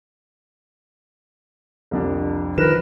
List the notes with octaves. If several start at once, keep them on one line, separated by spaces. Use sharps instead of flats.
C2 F2 D4
D#3 F3 A#4 B4 E7